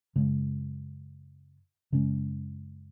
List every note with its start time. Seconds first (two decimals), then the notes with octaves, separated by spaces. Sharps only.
0.16 F#2 C#3 G#3
1.93 F#2 C#3 G#3 C#4